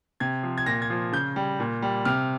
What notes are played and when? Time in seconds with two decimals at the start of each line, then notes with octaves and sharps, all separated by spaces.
0.20 C3 G#6
0.43 F3
0.58 G#6
0.66 A#2 A#6
0.82 G#6
0.90 F3
1.12 C#3 G6
1.36 G3
1.60 A#2
1.82 G3
2.05 C3 F6